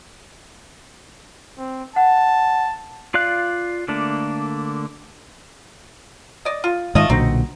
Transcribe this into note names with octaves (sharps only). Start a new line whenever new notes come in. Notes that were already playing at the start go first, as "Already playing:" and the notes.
C4
F#5 A5
F4 D5 F5 F#6
D3 A3 A#3 D4
D5 D#5
F4
G#2 D#3 A3 F4 D#5
B1 A#2 D3 C4 D#4 F#4